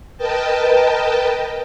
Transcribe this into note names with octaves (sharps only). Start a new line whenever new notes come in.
A#4 B4 D#5 G5 A5